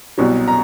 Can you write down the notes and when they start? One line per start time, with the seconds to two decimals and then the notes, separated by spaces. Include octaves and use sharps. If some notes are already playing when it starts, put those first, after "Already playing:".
0.18 C2 B2 F#3
0.48 A#5